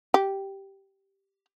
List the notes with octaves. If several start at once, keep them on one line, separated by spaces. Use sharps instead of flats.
G4